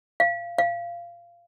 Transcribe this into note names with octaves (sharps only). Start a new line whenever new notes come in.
F5
F5